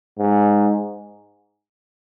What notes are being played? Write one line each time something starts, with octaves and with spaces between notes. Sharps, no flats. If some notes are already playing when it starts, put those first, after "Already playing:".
G#2